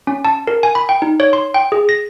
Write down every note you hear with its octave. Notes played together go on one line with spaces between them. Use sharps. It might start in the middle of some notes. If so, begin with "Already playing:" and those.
C#4
A5
A#4
G#5
B5
G5
D#4
C#5
C6
G5
G#4
A#6